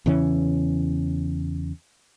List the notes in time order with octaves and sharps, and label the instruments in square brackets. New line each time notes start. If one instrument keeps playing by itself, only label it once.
[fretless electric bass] E2 C#3 E3 C#4